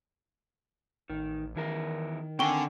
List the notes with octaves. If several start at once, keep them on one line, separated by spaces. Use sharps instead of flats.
A1 D#3
E2 D#3 E4 A#4
D3 C4 G5 G#5 C#6 G7